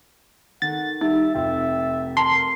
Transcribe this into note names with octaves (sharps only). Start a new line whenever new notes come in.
D#3 A4 F#5 A6
G3 D#4 E5
F1 F4 E5 G5
A#4 A5 C6